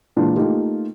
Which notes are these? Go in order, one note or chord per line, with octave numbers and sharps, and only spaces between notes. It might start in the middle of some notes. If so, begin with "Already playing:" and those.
A#2 E3 G#3 D4 F4
A3 A#3 D#4 F4 G4